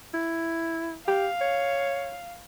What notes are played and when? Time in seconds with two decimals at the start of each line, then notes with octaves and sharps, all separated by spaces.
0.14 E4
1.08 G4 F5
1.41 C#5